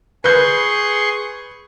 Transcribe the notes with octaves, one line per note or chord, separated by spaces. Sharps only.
G#4 B4 C6 C#6 G6